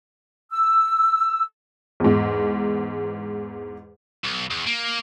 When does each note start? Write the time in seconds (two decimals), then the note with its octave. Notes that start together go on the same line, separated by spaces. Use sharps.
0.50 E6
2.00 E2 G#2
4.24 B1
4.51 E2
4.67 A#3